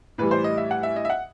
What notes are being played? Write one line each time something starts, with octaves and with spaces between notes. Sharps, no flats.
A2 E3 G3 B4
C5
D#5
E5
F#5
E5
D#5
E5
F#5